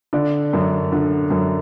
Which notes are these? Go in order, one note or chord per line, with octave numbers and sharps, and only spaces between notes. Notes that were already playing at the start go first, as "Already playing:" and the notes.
D3 D5
F#2
D3
F#2